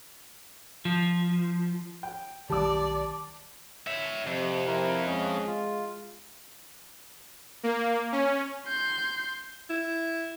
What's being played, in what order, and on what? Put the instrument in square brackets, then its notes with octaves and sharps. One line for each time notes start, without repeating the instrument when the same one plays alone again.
[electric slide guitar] F3
[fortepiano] G5
[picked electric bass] B1 D#3 [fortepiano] G3 E6 [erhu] D5 [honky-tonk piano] A5 D6
[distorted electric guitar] C#5 E5
[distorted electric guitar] F2 [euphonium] C3
[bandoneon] E4 A#4
[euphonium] G#3 [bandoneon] C#4 D#5
[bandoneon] F4
[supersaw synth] A#3
C#4
[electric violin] C6 G6
[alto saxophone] E4